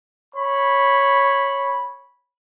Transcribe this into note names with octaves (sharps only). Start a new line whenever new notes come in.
C#5 B5